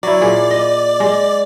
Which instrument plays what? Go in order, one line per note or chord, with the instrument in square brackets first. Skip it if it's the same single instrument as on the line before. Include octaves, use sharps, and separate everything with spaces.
[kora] F#3 E4 [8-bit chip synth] D5
[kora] A#2 G#4
D#5
G#3